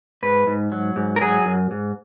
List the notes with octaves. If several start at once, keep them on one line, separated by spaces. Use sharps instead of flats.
G#2 B4
G#2
F#3
G#2
A#4
F#3 G#4
F#2
G#2